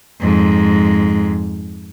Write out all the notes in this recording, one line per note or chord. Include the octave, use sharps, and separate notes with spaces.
F2 G#2